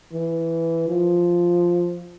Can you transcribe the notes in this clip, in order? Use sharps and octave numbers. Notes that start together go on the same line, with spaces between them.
E3
F3